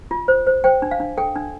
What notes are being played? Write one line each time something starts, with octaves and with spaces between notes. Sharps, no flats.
F4
C5
C5
C5 G5
D4
F5
D4
A4 G5
D4